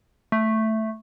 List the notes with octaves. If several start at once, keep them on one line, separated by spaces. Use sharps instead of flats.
A3